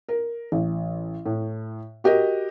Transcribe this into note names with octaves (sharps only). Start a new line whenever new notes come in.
A#4
A1
A2
F#4 G4 A#4 D#5